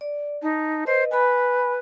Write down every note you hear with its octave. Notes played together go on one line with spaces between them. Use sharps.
D5
D#4 A5
B4 C5 D#5
B4 G#5 B5